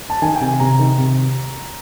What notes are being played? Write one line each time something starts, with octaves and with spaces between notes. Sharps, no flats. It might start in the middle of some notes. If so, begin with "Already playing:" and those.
A5
D#3 G#5
G5
C3 G#5
C3 A#5
D#3
C3